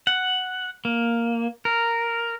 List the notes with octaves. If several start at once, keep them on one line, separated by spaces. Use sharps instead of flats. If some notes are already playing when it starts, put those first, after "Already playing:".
F#5
A#3
A#4